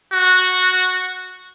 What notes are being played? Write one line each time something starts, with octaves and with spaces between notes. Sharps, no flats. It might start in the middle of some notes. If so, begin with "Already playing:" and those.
F#4